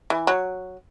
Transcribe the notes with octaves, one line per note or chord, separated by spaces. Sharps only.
E3
F#3